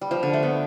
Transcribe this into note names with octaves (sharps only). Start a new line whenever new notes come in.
G3
F3
D3
A3
B3